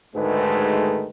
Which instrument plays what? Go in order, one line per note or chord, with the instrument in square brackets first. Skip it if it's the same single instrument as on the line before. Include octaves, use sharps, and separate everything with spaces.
[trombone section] D2 G#2 D#3 G#3 A3 B4